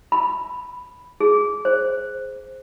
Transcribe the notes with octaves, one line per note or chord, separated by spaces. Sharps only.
B5
G#4
C5